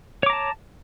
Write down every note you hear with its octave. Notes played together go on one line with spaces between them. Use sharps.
C#5 A5 A#5 D6